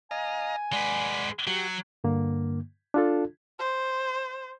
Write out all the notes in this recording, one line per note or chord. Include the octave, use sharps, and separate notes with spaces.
D#5 F5 G#5 A#5
G#3 B4 D5 F#5
F#3 F#4 G4
G2 D3 A#3
D4 F4 A4
C5